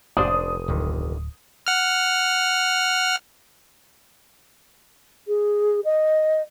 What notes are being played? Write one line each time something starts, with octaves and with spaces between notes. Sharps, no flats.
F1 D4 C5 D5 D#6
D1 G1 D3 D#3
F#5 F6
G#4
D#5